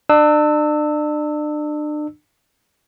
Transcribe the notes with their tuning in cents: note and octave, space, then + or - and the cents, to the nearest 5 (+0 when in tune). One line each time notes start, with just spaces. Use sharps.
D4 +35 E6 -15